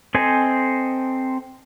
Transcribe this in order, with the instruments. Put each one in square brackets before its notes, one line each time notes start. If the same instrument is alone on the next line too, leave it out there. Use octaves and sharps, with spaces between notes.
[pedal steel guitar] C4 A4 C5 D#5 G#5